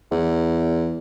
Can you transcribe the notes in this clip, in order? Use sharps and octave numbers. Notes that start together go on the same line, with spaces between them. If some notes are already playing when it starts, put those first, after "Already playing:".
E2